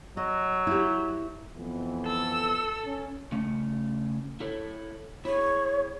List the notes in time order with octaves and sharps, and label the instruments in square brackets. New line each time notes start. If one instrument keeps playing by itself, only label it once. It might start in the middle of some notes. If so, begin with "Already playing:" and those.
[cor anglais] F#3 [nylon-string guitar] D#5
[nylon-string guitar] E4 G4
[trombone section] F2 E3 B3
[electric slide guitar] A4 [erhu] E6
[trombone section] C#4
[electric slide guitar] C#3 A3 C#4
E4 A4 C#5
[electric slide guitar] E4 G#4 [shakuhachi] C#5